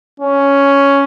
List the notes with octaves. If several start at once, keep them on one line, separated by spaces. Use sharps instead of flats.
C#4